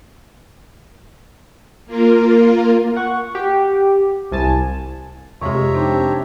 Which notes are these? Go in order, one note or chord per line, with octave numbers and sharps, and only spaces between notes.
A#3 F4 A#4
F#5 C#6
G4
C2 G#5 A5
F2 C3 G#3 G4 C#5 E5 A#5
D4 D#4 G4 C5
C4